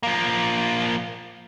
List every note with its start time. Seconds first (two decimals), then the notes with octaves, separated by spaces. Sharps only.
0.03 F3 A#3